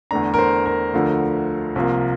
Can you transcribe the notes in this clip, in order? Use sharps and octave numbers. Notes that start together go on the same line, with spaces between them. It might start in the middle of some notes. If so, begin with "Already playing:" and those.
E2 D3 A3 D4 A#5
A#4
C5
A#4
D2 D3 F3 A3
C2 C3 F3 A#3